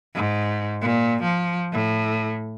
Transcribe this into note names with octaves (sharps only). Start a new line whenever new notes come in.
G#2
A#2
F3
A2